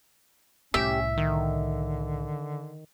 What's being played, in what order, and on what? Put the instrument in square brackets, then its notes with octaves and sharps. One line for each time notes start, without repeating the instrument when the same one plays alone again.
[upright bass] C2 A2 [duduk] C#4 [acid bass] G4 [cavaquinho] E5
[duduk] D3 [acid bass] D#3